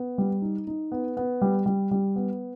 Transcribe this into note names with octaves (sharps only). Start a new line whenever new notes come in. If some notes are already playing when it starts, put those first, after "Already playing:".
Already playing: B3
G3
D#4
D#4
B3
B3
G3
G3
G3
B3